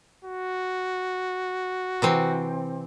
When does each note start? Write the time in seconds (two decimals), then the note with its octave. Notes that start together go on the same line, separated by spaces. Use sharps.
0.25 F#4
2.02 C3 E3 C4